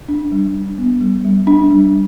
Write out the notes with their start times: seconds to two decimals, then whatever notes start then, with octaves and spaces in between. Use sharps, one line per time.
0.09 D4
0.32 G3
0.55 D4
0.78 B3
1.01 G3
1.25 G3
1.47 G3 D4
1.71 G3